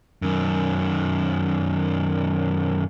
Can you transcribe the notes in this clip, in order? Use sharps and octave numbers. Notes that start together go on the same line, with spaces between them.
F#2 D#3